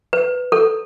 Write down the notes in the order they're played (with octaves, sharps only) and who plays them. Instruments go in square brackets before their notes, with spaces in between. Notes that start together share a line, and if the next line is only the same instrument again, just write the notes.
[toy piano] B4
A4